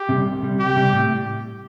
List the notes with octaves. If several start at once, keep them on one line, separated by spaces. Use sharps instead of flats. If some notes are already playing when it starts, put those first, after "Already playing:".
Already playing: G4
C3 G3
C2
C3 G3
C2 G4
C3 G3
A2